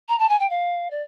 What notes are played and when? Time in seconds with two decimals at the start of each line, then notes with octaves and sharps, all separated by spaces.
0.08 A#5
0.19 A5
0.29 G#5
0.39 G5
0.49 F5
0.90 D5